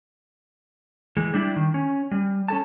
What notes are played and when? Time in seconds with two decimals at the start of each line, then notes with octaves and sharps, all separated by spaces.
1.17 E3 G#3
1.34 G3 D4 E4
1.56 D#3
1.74 C#4
2.11 G3
2.48 C#4 A4 A5